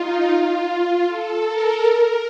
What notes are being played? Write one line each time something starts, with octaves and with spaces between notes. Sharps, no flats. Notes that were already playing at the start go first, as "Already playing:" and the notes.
Already playing: D#4 F4
F4
A4
A#4
A#4